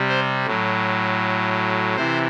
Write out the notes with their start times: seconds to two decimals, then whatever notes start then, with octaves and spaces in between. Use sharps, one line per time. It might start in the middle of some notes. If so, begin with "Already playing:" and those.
Already playing: C3 G3
0.09 C5
0.46 A2 F#3
1.96 C3 E3 C5